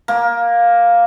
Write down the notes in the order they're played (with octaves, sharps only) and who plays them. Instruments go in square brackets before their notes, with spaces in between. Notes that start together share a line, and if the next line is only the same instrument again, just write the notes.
[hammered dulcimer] A#3